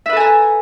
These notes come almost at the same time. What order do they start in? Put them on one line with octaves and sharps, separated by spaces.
E5 B4 A4 G#5 A#5